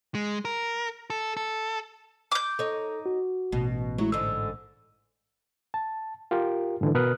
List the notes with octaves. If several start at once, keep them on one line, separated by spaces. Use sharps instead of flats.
G#3
A#4
A4
A4
D6 G6
D#4 A4 C#5
F#4
A1 B2
F#3 G#3 A3 E4
G#2 D3 E6
A5
F4 G4 A#4
G#2 D3 E3
B2 A#4 B4 D#6 F6 F#6